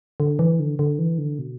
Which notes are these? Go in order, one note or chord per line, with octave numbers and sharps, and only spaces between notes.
D3
E3
D3
D3
E3
D3
B2